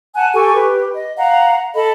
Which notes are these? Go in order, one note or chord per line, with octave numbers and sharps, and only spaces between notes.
F#5 G#5 A5 F#6
G4 A4 G#5 C#6
G4 B4
D#5
F5 F#5 A#5
A4 D#5 B5